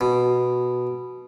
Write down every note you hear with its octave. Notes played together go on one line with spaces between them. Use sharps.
B2